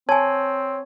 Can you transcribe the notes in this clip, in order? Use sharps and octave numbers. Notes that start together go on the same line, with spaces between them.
C4 C#5 G#5 A5